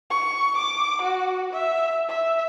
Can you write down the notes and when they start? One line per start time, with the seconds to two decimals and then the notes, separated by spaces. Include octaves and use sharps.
0.10 C#6
0.57 D6
1.02 F#4
1.53 E5
2.09 E5